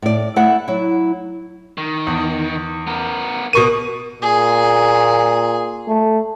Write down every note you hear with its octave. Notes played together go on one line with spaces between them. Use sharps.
A2 D5
A3 E4 F#5
F#3 E4
D#3
E2
B3 A#4
B2 A#4 C#6 D#7
A#2 G#4
A3